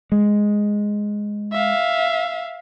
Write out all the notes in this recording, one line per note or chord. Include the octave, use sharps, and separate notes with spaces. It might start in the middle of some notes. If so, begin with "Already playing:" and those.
G#3
E5 F5